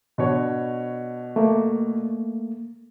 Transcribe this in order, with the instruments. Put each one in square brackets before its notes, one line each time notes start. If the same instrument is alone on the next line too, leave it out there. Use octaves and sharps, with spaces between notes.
[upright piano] B2 D4 C#5
[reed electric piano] A3 A#3